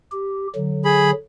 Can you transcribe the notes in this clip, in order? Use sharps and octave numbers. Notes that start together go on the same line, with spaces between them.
G4
D3 F#3
G#4 B5